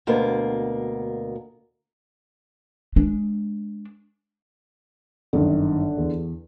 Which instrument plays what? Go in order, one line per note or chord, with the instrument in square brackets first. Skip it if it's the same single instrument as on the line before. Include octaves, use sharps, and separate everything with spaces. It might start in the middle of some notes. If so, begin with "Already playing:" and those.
[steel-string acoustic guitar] D2 B2 A#3
[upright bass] G#3 D4
[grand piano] G1 F#2 D#3 [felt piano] D3
[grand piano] E2